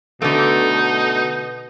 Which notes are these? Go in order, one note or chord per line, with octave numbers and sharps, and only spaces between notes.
B2 D3 A3 D#4